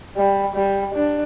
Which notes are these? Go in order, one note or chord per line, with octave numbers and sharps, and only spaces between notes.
G3
G3
D4